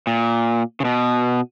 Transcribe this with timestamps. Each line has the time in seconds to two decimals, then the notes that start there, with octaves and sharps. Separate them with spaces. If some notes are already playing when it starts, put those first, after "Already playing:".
0.07 A#2
0.80 C#3
0.85 B2